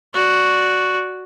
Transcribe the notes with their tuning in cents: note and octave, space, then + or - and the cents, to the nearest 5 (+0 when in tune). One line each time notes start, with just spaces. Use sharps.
F#4 +0 D5 +0